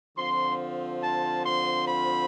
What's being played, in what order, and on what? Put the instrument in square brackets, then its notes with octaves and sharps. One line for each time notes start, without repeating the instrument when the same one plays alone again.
[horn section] D3 F3 C4 F4 C6
A5
C6
B5